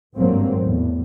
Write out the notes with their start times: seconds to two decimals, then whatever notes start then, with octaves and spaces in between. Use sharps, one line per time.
0.16 G#1 G2 F#3 A#3 C4
0.59 E2 A2